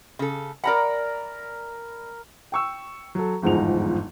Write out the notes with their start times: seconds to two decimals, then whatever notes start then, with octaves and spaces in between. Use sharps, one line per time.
0.19 C#3 A4
0.64 A#4 D5 F#5 A#5 B5
2.52 G5 C#6 E6
3.15 F#3 A4
3.42 G1 E2 G#2 F3 D#4 F7